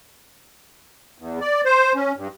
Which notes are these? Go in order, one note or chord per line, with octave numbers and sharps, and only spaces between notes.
E2
D5
C5
C#4
G2